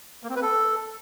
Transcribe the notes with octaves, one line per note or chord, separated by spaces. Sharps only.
A#3
C4
B4
A4